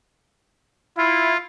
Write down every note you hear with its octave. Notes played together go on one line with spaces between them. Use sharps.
E4 F4